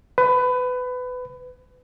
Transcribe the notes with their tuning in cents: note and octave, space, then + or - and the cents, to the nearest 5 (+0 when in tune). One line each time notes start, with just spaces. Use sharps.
B4 +25